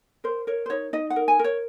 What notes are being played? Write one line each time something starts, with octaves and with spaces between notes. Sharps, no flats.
A#4 C5
A#4 C#5
C5
D#4 C#5
D#4 D#5
F#5
A#4
G#5
A#4
C#5